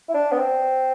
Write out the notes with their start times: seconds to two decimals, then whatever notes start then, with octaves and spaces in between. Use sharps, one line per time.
0.09 E4
0.14 D4
0.32 B3
0.38 C4